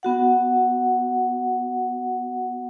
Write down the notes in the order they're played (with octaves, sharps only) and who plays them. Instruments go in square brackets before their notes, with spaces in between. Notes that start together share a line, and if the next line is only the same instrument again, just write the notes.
[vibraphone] B3 F#4 F#5